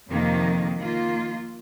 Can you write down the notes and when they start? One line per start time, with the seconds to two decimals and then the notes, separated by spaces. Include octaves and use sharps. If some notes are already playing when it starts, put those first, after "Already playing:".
0.10 F2 C3 D#3 A#3
0.79 D#3 A#3 F4